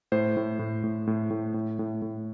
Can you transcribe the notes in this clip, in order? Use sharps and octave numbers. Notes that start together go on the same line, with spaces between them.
A2 C5
A2
A2
A2
A2
A2
A2
A2
A2